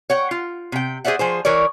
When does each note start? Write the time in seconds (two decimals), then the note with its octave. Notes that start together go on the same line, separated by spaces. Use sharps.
0.10 C#5 F#5 G5
0.31 F4
0.72 C3 G5
1.05 G#4 C5 D5 E5 F#5
1.19 F3 G#4 C5
1.45 E3 A#4 C#5 D5